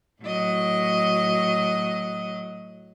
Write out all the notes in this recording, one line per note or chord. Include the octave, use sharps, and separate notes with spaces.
A2 F#3 D#5